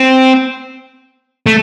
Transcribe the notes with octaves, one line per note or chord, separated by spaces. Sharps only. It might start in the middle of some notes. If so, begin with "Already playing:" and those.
Already playing: C4
A3